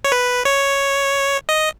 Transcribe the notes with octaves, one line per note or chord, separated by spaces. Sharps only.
C#5
B4
C#5
D#5